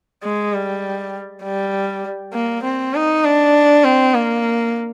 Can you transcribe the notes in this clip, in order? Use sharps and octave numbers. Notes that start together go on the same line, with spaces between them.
G#3
G3
G3
A#3
C4
D#4
D4
C4
A#3